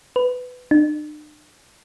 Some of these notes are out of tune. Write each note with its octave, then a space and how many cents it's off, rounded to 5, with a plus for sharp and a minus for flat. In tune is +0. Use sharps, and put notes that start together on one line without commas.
B4 +15
D4 +45